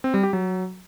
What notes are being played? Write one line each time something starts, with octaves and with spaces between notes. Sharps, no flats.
C4
G3
G4
F#3